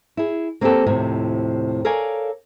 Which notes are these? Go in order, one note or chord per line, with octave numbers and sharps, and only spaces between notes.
E4 G#4
A#3 C4 E4 F#4 G4 A4
D#2 A2 C3 F3
A4 A#4 C#5 D5 F5 G#5